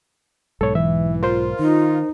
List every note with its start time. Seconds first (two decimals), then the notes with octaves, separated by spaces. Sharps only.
0.61 B1 G#2 A4 C#5
0.75 E3 E5
1.23 F4 A#4 C5
1.59 D#3 D#4